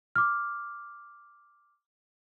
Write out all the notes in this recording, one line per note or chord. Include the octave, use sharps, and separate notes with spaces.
D6 F6